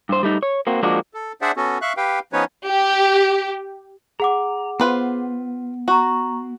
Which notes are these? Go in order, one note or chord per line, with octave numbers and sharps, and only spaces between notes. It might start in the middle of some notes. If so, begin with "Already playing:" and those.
G2 C5
G3 A3 D#4
C#5
A#3 C4 F#4
F3 G#3 A#3 D4 F#4
A4
D4 G#4 C5 D5 E5 F#5
B3 C#4 F#4 A4
E5 F5 C#6 F#6
G4 B4 F5 G5
F3 B3 C#4 D#4 B4 C#5
G4
G#4 F#5 A#5 D6
B3 F4 B4 C5
F#4 A#5 C#6